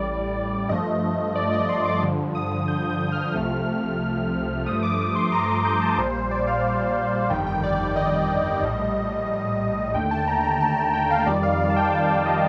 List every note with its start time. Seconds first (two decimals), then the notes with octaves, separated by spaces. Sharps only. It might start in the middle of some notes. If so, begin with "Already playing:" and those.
Already playing: A1 A2 G3 D5
0.69 G2 F3 A3 D#5
1.35 D5
1.52 D#5
1.69 C6
1.85 D6
2.02 G2 D3 F3
2.35 D#6
2.68 G6
2.89 G6
3.12 F6
3.34 C2 C3 F3 A3
4.66 G2 F3 A3 D#6
4.83 D6
5.15 C6
5.32 A#5
5.48 C6
5.65 G6
5.81 A5
5.98 A#1 A#2 G3 C5
6.15 C5
6.31 D5
6.47 F5
7.30 G1 F2 D#3 G3 G5
7.47 G5
7.63 D5
7.80 D5
7.96 D#5
8.62 A#1 A2 G3
9.94 D#2 D3 A3 G5
10.11 A5
10.28 A#5
10.44 A#5
10.61 A5
10.77 A5
10.94 G5
11.10 F5
11.26 F2 D#3 G3 D5
11.43 F5
11.60 F5
11.70 A5
11.76 G5
11.93 A5
12.09 G5
12.26 D#5